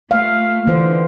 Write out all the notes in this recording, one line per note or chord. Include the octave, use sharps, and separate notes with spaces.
A3 F5
D3 E3 C5